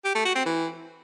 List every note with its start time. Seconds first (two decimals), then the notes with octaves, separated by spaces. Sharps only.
0.05 G4
0.15 A3
0.25 F#4
0.35 C4
0.46 E3